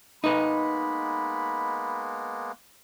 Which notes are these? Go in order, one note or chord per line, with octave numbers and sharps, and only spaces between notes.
G#3 A#3 B3 D#4 B4 B5